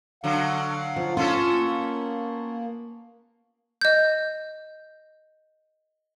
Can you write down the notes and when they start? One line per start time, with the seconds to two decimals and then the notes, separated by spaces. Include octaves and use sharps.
0.24 D3 F#3 F5 F#5
0.96 F3
1.17 B3 C#4 F4 A4
1.53 A#3
3.81 D#5 G6